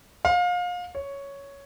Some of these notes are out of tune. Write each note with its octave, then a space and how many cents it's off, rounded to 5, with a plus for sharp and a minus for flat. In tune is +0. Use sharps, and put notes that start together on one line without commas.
F5 +30
C#5 +5